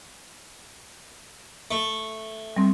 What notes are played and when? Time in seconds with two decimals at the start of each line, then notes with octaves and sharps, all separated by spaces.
1.71 A3
2.57 G3 C4